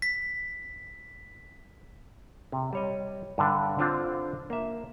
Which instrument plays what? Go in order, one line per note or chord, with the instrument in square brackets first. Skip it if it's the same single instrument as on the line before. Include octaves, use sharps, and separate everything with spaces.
[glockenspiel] B6
[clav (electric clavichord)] C3
G3 C#5 D#5
G2 D3 D4
D3 C4 D4 F4
A#3 E5